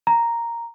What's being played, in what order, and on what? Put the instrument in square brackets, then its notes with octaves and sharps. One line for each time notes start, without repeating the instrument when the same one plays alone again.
[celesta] A#5